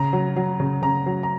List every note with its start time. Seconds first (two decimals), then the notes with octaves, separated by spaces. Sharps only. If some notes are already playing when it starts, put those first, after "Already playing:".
Already playing: C#3 A#5
0.13 F#3
0.36 F#3
0.60 C#3
0.82 C#3 A#5
1.06 F#3
1.23 A#5